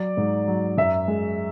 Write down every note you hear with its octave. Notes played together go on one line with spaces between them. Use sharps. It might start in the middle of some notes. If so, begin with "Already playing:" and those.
Already playing: F#3 D5
G#2
F#3
F#2 E5
G#3